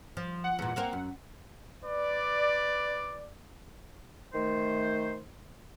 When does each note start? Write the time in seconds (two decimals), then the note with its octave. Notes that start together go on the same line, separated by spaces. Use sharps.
0.17 F3
0.44 F#5
0.59 E2 A#2
0.76 A#3 C4 A#4
0.93 F#2
1.84 B4 D5
4.33 D#3 A3 C5